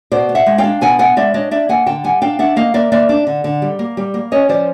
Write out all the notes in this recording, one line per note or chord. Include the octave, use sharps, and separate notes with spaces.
B2 C5 D5
B3
E5 F#5
G#3
F5 G5
D4
B2 F#5 G#5
B3 F#5 G#5
G#3 D5 E5
D4 C#5 D#5
D4 D5 E5
A#3 F#5 G#5
D3 G5 A5
G3 F#5 G#5
D4 F5 G5
D4 E5 F#5
A#3 D#5 F5
A#3 D5 E5
A#3 D5 E5
D4
D3
D3
G3
A#3
G3
A#3
C#4 C#5 D#5
F3 C5 D5